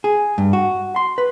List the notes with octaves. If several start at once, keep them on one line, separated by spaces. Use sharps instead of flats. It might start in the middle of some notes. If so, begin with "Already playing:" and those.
G#4
G2
F#4
C6
B4